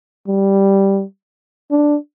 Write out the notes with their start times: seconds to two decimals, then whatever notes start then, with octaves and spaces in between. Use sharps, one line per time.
0.28 G3
1.71 D4